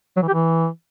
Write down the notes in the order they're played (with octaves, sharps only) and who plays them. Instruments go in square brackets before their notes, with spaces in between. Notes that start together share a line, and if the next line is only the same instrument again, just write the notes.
[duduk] F#3
E3
G4
E3